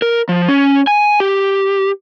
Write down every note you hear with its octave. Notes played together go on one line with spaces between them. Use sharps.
A#4
F3
C#4
G#5
G4